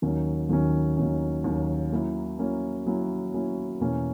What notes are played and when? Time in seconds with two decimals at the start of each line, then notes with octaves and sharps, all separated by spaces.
0.02 D#2 D#3 F#3 C#4
0.49 D#2 D#3 F#3 C#4
0.96 D#2 D#3 F#3 C#4
1.44 D#2 D#3 F#3 C#4
1.92 F#3 A#3 C#4 E4
2.39 F#3 A#3 C#4 E4
2.86 F#3 A#3 C#4 E4
3.34 F#3 A#3 C#4 E4
3.80 E2 B2 A#3 C#4